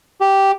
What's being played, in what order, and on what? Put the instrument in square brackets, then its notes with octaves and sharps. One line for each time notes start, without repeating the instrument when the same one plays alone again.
[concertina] G4